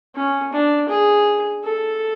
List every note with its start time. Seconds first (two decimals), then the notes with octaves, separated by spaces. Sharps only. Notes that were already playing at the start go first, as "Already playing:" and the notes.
0.15 C#4
0.53 D4
0.89 G#4
1.64 A4